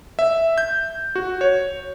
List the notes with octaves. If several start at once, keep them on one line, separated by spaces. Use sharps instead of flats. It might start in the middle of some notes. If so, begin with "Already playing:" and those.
E5
G6
F#4
C#5